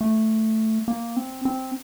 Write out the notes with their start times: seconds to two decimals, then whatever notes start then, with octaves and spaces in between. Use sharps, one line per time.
0.01 A3
0.88 A#3
1.17 C4
1.45 C4